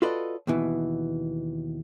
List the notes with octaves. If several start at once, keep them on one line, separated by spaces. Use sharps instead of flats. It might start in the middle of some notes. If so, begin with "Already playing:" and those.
F4 F#4 A4 B4 D5 D#5
D#2 B2 E3